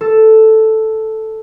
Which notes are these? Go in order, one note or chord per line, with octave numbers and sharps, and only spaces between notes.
A4